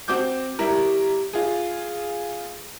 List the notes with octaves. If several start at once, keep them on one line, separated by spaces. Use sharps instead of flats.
C4 F#4 D6 G6
G3 E4 A#4
F4 G#4